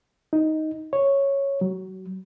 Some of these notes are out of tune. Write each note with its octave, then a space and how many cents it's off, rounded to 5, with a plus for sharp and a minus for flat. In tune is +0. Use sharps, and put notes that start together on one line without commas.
D#4 +5
C#5 -5
F#3 +25